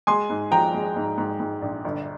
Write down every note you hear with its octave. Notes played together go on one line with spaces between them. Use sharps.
G#3 G#5 C6
G#2
F3 G5 A#5
G#3
G#2
G#2
G#2
A#1
G1